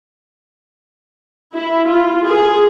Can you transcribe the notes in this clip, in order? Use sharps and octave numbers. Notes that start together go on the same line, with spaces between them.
E4
F4
G#4